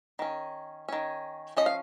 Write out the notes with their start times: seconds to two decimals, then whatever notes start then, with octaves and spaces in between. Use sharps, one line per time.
0.19 D#3 C#4
0.89 D#3 C#4
1.57 F3 C#4 D#5
1.66 F5